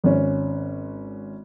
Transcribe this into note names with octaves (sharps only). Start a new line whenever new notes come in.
G#1 C#4